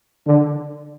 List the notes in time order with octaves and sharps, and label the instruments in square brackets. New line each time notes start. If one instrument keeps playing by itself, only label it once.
[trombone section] D3